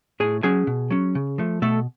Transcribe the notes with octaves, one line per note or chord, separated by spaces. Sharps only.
A2 G#4 G#5
F#3 C#4 G#4 G#5
B2
F#3 C#4
C#3
F3 A3
B2 A3 A4